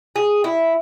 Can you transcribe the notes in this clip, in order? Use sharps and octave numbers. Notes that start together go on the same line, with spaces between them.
G#4
E4